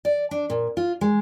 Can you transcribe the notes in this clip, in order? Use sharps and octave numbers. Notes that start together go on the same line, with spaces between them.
D5
D4
A#2
F4
G#3